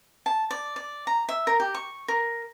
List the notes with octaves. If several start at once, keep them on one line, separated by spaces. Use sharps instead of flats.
A5
D5
D5
A#5
E5
A#4
G4
C#6
A#4